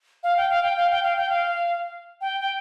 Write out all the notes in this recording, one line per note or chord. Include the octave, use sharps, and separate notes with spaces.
F5
G5
F5
G5
F5
G5
F5
G5
F5
G5
G5